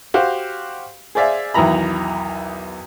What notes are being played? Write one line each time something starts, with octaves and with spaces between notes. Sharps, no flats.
F#4 G4 C5 F5
G#4 C5 D5 E5 F5 G#5
B1 E2 D#3 E3 A#5 B5